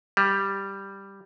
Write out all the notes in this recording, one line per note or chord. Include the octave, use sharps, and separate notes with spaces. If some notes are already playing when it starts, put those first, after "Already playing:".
G3